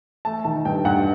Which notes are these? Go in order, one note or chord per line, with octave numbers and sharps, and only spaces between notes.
A3 A5
D#3 A5
G2 G5
G2 F#5